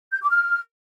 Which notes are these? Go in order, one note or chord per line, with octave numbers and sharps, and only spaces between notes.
G6
D6
F6